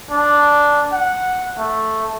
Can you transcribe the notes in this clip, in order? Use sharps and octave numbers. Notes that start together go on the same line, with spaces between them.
D4
F#5
A3